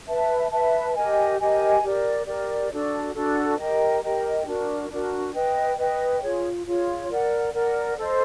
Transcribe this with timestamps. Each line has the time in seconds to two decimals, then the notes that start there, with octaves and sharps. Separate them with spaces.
0.07 B4 E5 A5
0.50 B4 E5 A5
0.95 G4 A#4 D#5 G#5
1.39 G4 A#4 D#5 G#5
1.82 G4 A#4 D5
2.26 G4 A#4 D5
2.71 D4 F#4 A4
3.14 D4 F#4 A4
3.58 G4 A#4 D#5 G5
4.01 G4 A#4 D#5 G5
4.45 D4 F#4 A#4
4.90 D4 F#4 A#4
5.34 B4 D#5 G5
5.77 B4 D#5 G5
6.21 F4 G#4 C#5
6.66 F4 G#4 C#5
7.10 A#4 D5 F#5
7.53 A#4 D5 F#5
7.97 A4 C5 D#5